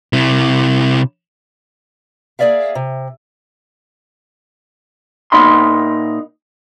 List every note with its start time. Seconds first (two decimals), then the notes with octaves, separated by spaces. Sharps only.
0.13 C3 E4
2.39 A#3 G#4 A4 D5 E5 F5
2.75 C3
5.32 A#2 D#4 B5 C6